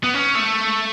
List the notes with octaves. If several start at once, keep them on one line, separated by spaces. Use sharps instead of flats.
B3
C#4
A3